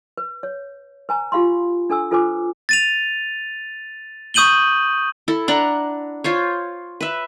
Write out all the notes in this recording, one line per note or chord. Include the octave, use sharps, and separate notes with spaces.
B4
C#5
B4 G#5 A#5
F4 G4 F5 B5 C6
D4 A4 G#5 E6
F4 A4 B4 C5 G#5 D6
A6 D#7 F7
C#6 D#6 G6 D#7 F#7 G7
E4 A4
D4 F#5 A#5
F4 C5 C#5
B4 E5